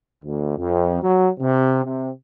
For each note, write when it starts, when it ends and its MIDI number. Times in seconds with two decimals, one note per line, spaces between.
0.24 0.57 38
0.58 0.99 41
1.03 1.29 54
1.40 1.81 48
1.85 2.09 48